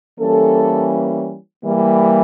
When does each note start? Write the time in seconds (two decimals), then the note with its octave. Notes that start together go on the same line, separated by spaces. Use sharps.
0.19 E3 G3 A#3 C#4 A4
1.64 E3 G3 A#3